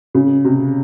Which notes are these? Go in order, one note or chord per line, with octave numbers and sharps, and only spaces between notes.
C#3
C3